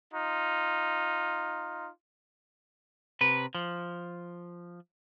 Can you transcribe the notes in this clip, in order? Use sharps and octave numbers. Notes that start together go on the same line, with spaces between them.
D#4 F4
C3 B4
F3